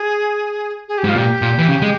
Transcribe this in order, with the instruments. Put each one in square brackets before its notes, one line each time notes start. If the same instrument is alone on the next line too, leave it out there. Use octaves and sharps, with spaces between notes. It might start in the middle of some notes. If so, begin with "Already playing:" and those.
Already playing: [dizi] G#4
G#4
G4
[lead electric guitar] G#2 [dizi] F4
[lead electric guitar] A#2 [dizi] G4
[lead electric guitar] A#2
E3
C#3
G#3